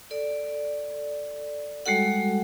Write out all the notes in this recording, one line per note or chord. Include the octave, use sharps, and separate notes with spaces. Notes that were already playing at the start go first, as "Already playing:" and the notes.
A4 D5
G3 G#3 F#4 A4 F#5